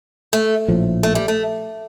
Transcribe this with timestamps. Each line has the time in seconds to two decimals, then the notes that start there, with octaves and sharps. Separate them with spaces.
0.33 A3
0.68 A#1 A2 F3
1.03 A3
1.15 G3
1.28 A3